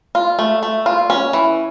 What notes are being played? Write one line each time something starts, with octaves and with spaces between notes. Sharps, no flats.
F4
A3
A3
F4
C#4
E3